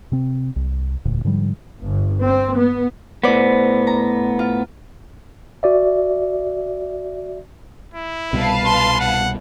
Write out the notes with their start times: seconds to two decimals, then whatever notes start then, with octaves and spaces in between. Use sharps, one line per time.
0.12 C3 C4
0.56 C2
1.05 E1 D2 A#2
1.25 G#2 D3 F3 G3
1.82 G1
2.23 C4
2.57 B3
3.24 A2 B3 C5 D5
3.87 A#5
4.39 F4
5.63 F#4 D5 E5
7.94 E4
8.33 C2 B2 G3 B4 F5 A5
8.66 C6
9.00 F#5